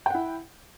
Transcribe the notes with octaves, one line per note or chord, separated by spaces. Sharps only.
E4 F#5 G5